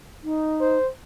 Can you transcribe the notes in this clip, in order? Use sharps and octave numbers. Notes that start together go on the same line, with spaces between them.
D#4
C5